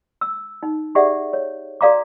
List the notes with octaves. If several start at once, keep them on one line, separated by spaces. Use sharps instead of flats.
E6
D#4
G4 G#4 D5 E5 F#5
C#5
F#4 A4 D5 F5 A#5 D6